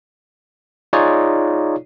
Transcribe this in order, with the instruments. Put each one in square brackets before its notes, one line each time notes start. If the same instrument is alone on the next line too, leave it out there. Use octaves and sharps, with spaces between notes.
[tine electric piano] D#4 F4 G#4 C#5 D5